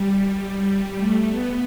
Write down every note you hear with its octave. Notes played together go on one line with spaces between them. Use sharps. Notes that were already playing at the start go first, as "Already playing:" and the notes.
Already playing: G3
A3
B3